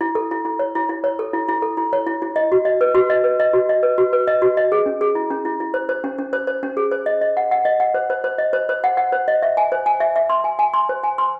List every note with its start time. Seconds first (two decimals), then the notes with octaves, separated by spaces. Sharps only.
0.01 E4
0.15 A4
0.31 E4
0.45 E4
0.59 C#5
0.75 E4
0.89 E4
1.04 C#5
1.19 A4
1.33 E4
1.48 E4
1.62 A4
1.77 E4
1.93 C#5
2.07 E4
2.22 E4
2.36 D#5
2.52 F#4
2.65 D#5
2.81 B4
2.95 F#4
3.10 D#5
3.24 B4
3.40 D#5
3.53 F#4
3.69 D#5
3.83 B4
3.98 F#4
4.13 B4
4.27 D#5
4.42 F#4
4.57 D#5
4.72 G#4
4.86 C#4
5.01 G#4
5.15 E4
5.31 C#4
5.45 E4
5.60 E4
5.74 C5
5.89 C5
6.04 C#4
6.18 C#4
6.33 C5
6.47 C5
6.63 C#4
6.77 G#4
6.91 C5
7.06 D#5
7.21 D#5
7.37 F#5
7.51 F#5
7.65 D#5
7.80 F#5
7.94 C5
8.10 C5
8.24 C5
8.38 D#5
8.53 C5
8.69 C5
8.84 F#5
8.97 F#5
9.12 C5
9.28 D#5
9.42 E5
9.57 G#5
9.72 C5
9.86 G#5
10.00 E5
10.16 E5
10.30 C6
10.44 G#5
10.59 G#5
10.74 C6
10.89 C5
11.03 G#5
11.18 C6